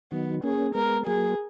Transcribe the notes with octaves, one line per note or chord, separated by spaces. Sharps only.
D#3 F#3 B3
A#3 C#4 G#4
G#3 B3 A#4
F#3 A#3 G#4